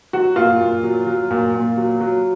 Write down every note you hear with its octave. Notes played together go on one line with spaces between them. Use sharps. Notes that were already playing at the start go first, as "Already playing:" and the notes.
F#3 F#4
A#2 F4
A#2
F#3
F#3
A#2
A#2
F#3
F#3